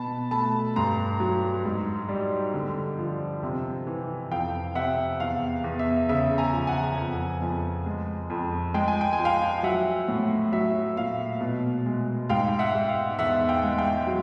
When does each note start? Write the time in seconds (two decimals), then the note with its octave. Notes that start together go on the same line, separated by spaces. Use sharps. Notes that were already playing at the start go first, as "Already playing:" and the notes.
Already playing: B2 A5 B5
0.31 A3 A5 B5
0.76 G2 A#5 C6
1.20 F#3
1.65 G#2
2.09 G3
2.54 D3
2.99 F3
3.43 C3
3.87 E3
4.31 F2 F5 G5
4.75 C3 E5 F#5
5.20 E2 F5
5.64 E2
5.79 E5
6.09 C#3 E5
6.38 G#5 A#5
6.53 F3
6.67 F#5 G#5
6.97 F2
7.42 F2
7.86 G#3
8.30 F2
8.74 G#3 G5
8.88 G#5
9.01 G5
9.13 G#5
9.19 F3
9.25 F5 G5
9.63 F#3 E5 F#5
10.08 A2
10.52 F#3 E5
10.96 A#2 F5
11.41 B2
11.86 G#3
12.29 G#2 F5 G5
12.59 E5 F#5
12.75 G#2
12.89 F5
13.19 E2 E5 F#5
13.48 F5 G5
13.63 G#3
13.78 F5 G5
14.07 F#3